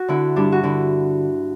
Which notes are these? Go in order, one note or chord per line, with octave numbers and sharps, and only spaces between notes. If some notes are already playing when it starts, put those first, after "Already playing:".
Already playing: F#4
D3 E4
G2 D4
F#4
D3 E4